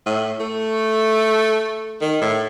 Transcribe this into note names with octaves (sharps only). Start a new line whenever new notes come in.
A2
A3
D#3
A2